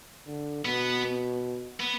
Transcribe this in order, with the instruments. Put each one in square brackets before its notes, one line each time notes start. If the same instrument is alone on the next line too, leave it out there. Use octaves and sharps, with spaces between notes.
[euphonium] D3
[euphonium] B2 [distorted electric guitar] B3
[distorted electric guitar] B3